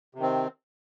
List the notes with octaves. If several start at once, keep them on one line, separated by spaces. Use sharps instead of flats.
C3 D#3 C4